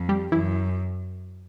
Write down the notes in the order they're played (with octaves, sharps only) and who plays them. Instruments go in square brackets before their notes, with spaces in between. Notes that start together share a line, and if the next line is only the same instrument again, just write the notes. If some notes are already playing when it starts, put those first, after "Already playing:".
Already playing: [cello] F2
[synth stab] G3 G4
[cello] F#2 [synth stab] E3 E4